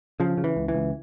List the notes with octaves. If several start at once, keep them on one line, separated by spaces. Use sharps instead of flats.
C#3 F3
C#3
E3
C#2
E3
C#2